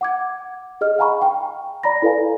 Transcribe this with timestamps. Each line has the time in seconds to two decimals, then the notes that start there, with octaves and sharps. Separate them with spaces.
0.01 F#5 D6 G#6
0.81 G#4 D#5 F6
0.98 F5 F#5 G#5 A#5 B5 C#6
1.22 G5 C#6
1.83 D5 A#5 B5 A#6
2.02 E4 A4 B4 D5 F5 G#5